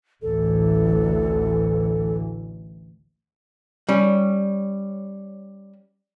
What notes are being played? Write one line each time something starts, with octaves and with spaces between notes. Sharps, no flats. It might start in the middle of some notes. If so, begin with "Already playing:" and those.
A1 D2 E3 A4
G3 C#4